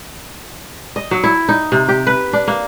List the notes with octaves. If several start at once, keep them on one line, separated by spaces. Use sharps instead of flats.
D#5
F#3
E4
D#4
C3
G4
B4
D4
A#3